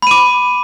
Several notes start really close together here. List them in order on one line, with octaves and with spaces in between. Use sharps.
B5 D#7 D6